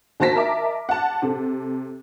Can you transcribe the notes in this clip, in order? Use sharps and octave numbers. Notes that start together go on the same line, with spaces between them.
D#2 F#4 C5 A5 A#6 B6
A#4 D#5 E5 A5 D6
F#5 A5
C3 A4